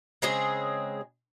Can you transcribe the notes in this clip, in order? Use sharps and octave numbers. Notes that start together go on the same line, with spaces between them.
C#3 G#3 C4 G#4